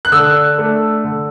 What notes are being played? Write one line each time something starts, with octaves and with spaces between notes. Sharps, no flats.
F#6
D3 E6
A3 D4
D3